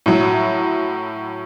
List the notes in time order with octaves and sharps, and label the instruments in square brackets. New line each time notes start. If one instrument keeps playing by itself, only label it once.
[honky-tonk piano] A2 F#3